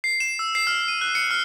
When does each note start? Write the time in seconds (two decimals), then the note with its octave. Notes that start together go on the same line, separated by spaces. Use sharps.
0.04 C7
0.20 E7
0.39 E6
0.55 C7
0.67 F6
0.88 D#7
1.01 F#6
1.15 C#7
1.31 F6